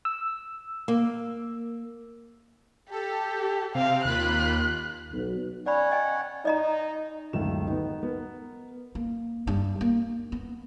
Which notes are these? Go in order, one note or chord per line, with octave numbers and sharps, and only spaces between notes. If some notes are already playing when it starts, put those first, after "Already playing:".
E6
A#3
G4 A4
C3 C4 F5
D#2 A#3 F4 B5 F#6
B1
C#4 C#5 D5 F#5 B5
D#5 G5 G#5
D#4 D5 D#5 A#5
D1 C#2 F#2 D#3 A3 E7
B3 D#4
B3 A#4
A#3
G2
A#3
B3